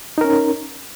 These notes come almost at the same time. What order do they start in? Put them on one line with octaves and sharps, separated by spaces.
D#4 A#4 C#4